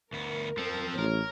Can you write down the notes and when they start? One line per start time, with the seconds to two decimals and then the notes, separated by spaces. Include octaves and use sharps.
0.13 D2 B3 A#4
0.58 F3 C4 A4
0.98 A1 A#4 C#5